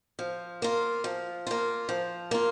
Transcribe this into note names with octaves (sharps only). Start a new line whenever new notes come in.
F3
A#3 F4
F3
A#3 F4
F3
A#3 F4